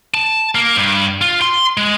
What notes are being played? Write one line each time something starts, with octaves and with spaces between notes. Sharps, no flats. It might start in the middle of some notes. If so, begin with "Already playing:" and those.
A5
A#3
G2
F4
C6
G#3